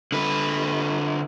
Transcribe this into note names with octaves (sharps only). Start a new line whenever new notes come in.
D3 B4